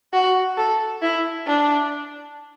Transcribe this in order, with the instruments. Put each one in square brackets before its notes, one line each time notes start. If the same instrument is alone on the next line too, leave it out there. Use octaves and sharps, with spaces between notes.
[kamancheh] F#4
A4
E4
D4